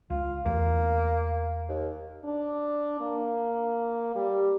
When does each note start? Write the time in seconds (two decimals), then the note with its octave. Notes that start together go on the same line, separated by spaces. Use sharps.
0.10 C#2 F4
0.46 E2 A3 A#3
1.69 D#2
2.24 D4
3.01 A#3
4.15 G3